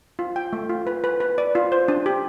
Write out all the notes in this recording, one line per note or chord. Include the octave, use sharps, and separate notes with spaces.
F4
G5
A3
F4
B4
B4
B4
D5
F4
C5
D4
G4